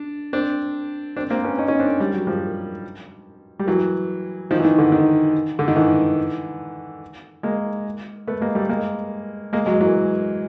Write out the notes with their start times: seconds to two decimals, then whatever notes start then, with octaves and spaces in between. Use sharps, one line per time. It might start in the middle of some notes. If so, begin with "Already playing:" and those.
Already playing: D4
0.33 C4 D4
1.16 C4 D4
1.30 A#3 C4
1.44 B3 C#4
1.58 C#4 D#4
1.68 C#4 D#4
1.79 C4 D4
2.00 G3
2.13 F#3
2.27 F3 G3
3.59 G3
3.67 E3 F#3
4.51 D#3 F3
4.60 E3
4.65 D#3
4.78 D3
4.92 D#3
5.59 D3
5.68 D#3
5.76 D3 E3
7.43 G#3 A#3
8.27 A3 B3
8.41 G#3 A#3
8.55 G3 A3
8.69 G#3 A#3
9.53 G#3 A#3
9.66 F#3 G#3
9.81 E3 F#3